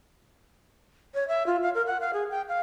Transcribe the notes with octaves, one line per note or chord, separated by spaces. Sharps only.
C#5
E5
F4
F5
A#4
F#5
F5
G#4
G5
F5